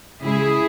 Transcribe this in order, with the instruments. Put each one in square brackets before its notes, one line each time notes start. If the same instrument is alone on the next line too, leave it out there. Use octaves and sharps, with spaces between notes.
[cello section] C#3 G#3 E4 G#4